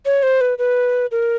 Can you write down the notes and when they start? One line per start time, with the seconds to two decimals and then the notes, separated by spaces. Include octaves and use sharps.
0.06 C#5
0.23 C5
0.41 B4
0.58 B4
1.11 A#4